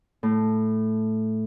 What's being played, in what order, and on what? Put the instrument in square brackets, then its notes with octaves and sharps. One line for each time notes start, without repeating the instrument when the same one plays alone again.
[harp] A2